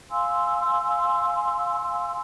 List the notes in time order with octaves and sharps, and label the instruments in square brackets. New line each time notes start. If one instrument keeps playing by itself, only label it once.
[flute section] F5 G#5 C6 E6